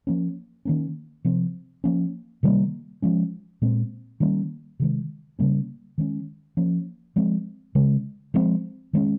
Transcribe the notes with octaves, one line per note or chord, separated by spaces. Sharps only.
F3 A#3 C#4
D#3 A#3 C#4
C3 F3 C4
F3 A#3 C#4
C3 D#3 G3 A#3
F3 G#3 C#4
A#2 G#3 C4
D#3 G3 A#3 C#4
C3 D#3 G#3
C#3 G3 A#3 C#4
D#3 G#3 C#4
F3 A#3 C#4
F3 G#3 C4
C#3 G#3 C#4
F3 G#3 C4
D#3 G#3 C#4